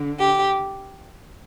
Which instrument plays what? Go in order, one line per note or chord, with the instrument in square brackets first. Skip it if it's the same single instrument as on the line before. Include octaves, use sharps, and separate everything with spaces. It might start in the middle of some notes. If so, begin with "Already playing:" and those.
Already playing: [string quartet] D3
G4